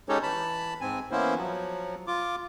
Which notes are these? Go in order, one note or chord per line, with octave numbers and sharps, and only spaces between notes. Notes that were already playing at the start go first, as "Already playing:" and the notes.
G#3 C#4 D#4 G4 A4 C#5
E3 A5 B5
G#2 C4 G#5
E3 A#3 B3 C#4 E4 C5
F3 F#3
F4 D6